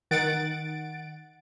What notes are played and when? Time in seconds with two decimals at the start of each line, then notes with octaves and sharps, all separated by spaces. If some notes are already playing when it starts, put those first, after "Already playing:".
0.11 D#3 F#5 A6 D7